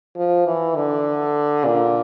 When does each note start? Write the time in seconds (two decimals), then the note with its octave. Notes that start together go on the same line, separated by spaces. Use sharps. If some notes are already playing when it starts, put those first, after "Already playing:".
0.16 F3
0.47 E3
0.76 D3
1.65 A#2